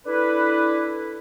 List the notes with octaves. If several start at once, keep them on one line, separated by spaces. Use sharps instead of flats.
D4 E4 A4 B4